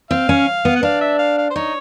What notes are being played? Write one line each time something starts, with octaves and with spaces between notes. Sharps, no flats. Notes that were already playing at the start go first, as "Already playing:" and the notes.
C4 F5
C#4
B3
F#5
D4 F5
E5
F5
F5
C5
D#4 C#5